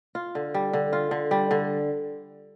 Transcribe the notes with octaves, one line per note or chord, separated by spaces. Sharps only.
F4
D3
G3
D3
F4
D3
G3
D3